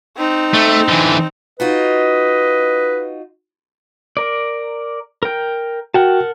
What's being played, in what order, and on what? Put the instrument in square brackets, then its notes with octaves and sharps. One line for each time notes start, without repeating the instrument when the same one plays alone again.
[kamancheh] C4 D#4
[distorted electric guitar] A3
D3 E3
[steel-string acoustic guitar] D#4 F4 F#4 [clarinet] B4 [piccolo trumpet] D#5
[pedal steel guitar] A#4 D5
A#4 G5
[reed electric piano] F#4 G5 [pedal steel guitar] A#4 F#5 A5